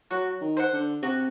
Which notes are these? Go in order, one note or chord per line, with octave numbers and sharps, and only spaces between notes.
F#3 F#4
D#3
C5 F#5
D3
C3 F#4